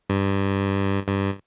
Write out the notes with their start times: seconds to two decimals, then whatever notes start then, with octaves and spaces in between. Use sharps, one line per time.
0.10 G2
1.08 G2